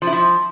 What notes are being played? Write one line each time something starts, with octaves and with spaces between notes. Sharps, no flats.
F3
E4
F3